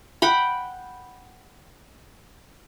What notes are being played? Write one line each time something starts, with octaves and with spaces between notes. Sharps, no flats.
F#5 G5 B5